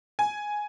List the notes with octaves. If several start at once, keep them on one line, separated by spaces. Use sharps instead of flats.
G#5